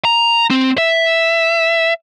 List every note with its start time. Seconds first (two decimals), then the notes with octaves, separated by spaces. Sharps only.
0.05 A#5
0.50 C4
0.78 E5